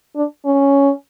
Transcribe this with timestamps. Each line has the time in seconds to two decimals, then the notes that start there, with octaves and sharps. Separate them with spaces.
0.15 D4
0.45 C#4